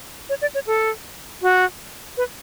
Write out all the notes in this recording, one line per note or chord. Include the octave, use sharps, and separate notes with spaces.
C#5
D5
C#5
A4
F#4
B4